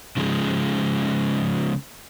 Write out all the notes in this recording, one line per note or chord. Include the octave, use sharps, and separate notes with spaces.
C#3 F3 F#3 G#3